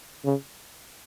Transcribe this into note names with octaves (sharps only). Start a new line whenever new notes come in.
C#3